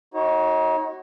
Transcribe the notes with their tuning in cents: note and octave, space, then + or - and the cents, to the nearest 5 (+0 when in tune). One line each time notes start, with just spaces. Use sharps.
D#4 +30 F#4 +20 C#5 -25